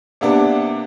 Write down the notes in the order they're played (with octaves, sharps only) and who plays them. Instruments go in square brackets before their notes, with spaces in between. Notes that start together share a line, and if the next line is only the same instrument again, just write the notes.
[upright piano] C3 A#3 B3 D4